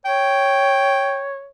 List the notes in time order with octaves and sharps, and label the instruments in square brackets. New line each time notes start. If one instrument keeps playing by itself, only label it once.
[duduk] C#5 [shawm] G5